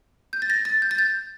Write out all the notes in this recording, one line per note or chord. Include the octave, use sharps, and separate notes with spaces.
G6
A6
A#6
A6
G6
A6
G6